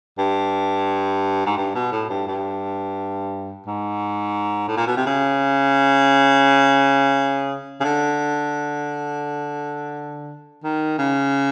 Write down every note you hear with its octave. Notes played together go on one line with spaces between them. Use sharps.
G2
G#2
G2
B2
A2
G2
G2
G#2
A2
A#2
B2
C3
C#3
C#3
D3
D#3
C#3